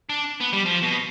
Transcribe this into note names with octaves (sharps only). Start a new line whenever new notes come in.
D4
B3
G3
F3
B2